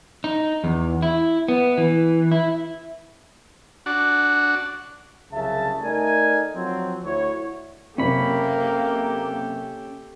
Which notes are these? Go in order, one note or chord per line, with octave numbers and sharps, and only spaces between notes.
D#4
E2
E4
B3
E3
E4
D4 F#4
C2 F#2 C#3 E5 A5
A3 D#4 A#4 D5 G#5
F3 F#3 C4
D2 E4 F#4 C#5
F#1 C3 A#3 C#4 G4 A4 B5